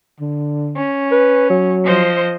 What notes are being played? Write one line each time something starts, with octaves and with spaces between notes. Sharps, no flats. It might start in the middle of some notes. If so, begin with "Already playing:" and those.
D3
C#4
B4
F#3
F3 C5 D#5